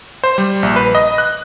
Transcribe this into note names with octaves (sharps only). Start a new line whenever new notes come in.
C5
G3
A#1
B4
D#5
F#6